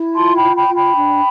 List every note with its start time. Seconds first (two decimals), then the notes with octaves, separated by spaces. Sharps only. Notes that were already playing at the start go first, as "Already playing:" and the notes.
Already playing: E4
0.16 F4 A5 C6
0.35 G5 B5
0.42 F4
0.55 G5 B5
0.67 F4
0.75 G5 B5
0.94 D4